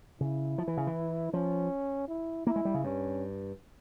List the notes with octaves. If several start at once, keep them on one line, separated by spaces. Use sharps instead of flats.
C#3 E4
F3
E3
C#3
E3
F3 C#4
E4
A#3 E4
G#3
G3
C#3
G2 C#4